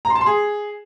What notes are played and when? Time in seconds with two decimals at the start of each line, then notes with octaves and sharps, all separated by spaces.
0.05 A#5
0.10 C6
0.16 A5
0.21 C6
0.26 G#4